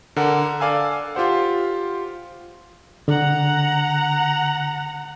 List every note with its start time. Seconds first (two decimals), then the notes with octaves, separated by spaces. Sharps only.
0.16 D3 A#4 F#5 F#6
0.60 A4 D5 F5 G#5 E6
1.15 F4 G4 C5 F#5
3.08 D3 F#5 A#5